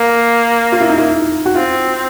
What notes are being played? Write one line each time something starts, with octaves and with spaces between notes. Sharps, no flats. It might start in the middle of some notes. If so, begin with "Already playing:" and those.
Already playing: A#3
F4
E4
D#4
E4
F#4
C4 F4